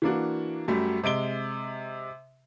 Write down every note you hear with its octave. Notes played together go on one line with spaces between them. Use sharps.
E3 A#3 D4 F#4
F#2 F#3 G3 A3
C3 G#3 D7 G7